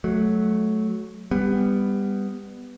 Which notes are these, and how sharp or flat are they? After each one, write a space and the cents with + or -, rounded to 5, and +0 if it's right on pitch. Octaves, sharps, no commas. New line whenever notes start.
F#3 +0 A3 -20
G3 +20 B3 +10